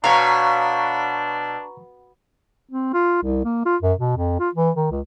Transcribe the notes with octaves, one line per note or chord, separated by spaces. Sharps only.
B2 D4 C#5 F5 A#5 C#6
C4
F4
C2
A#3
F4
F#2
B2
F2
F4
E3
D#3
C#2